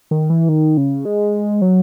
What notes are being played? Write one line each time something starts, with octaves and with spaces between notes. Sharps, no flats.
D#3
E3
D#3
C#3
G#3
F#3